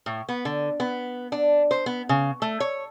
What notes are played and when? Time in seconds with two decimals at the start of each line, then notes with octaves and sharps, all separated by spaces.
0.06 A2
0.29 B3
0.45 D3
0.80 B3
1.32 D4
1.71 C5
1.86 B3
2.09 C#3
2.42 A3
2.60 C#5